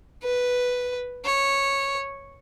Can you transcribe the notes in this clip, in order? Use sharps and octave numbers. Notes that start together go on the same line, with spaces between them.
B4
C#5